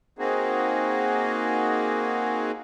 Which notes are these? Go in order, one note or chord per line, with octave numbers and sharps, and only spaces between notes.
A#3 C4 D#4 F#4 G#4